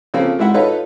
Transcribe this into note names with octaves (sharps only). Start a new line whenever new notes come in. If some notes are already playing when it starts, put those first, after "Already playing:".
C#3 F3 A#3 C4 A4
G#2 G#3 E4 E5 F#5
D#4 F4 A4 B4 C#5 F5